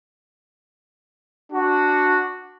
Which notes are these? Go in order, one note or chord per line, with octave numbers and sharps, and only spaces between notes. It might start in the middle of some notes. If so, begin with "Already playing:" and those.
D4 F#4